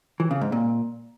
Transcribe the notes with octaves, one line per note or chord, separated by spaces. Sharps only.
E3
C#3
G#2
A#2